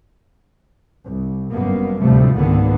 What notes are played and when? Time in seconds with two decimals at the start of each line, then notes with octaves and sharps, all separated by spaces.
1.05 C2
1.52 G1 F#2 A#3 B3
2.01 D2 A2 C3 F3 G3 A3
2.37 G#1 C#2 D3 D#3 A#3 B3